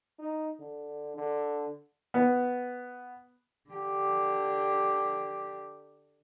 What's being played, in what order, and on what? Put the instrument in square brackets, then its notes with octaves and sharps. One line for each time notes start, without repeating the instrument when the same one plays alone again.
[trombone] D#4
D3
D3
[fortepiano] B3
[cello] D3 G4